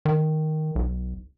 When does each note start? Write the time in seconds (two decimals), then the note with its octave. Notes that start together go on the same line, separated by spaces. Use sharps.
0.05 D#3
0.75 B1